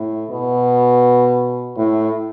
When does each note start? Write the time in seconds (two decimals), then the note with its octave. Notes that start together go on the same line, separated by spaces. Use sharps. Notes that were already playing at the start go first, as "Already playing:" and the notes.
Already playing: A2
0.30 B2
1.77 A2